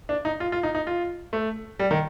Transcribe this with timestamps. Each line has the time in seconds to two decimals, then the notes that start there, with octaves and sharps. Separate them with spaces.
0.09 D4
0.25 D#4
0.40 F4
0.52 F4
0.63 D#4
0.75 D#4
0.87 F4
1.33 A3
1.79 G3
1.91 D#3